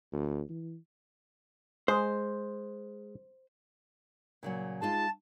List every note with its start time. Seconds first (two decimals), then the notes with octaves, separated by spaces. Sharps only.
0.12 D2
0.49 E3
1.88 G#3 C5
4.43 A#2 C#3 F#3
4.82 G#3 D#4 F4 A5